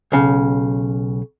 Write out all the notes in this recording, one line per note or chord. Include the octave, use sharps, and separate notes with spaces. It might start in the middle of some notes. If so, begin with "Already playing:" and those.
B1 C#3